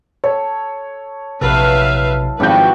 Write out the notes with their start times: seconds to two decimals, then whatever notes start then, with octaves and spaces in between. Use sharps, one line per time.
0.24 A4 C#5
1.41 A#1 C3 F#3 E4 A4 B4 E5 F5
2.40 G#1 F3 E4 F#4 G4 B4 F5 G6